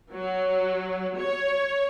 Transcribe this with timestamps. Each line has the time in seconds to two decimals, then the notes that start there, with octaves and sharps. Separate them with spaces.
0.14 F#3
1.18 C#5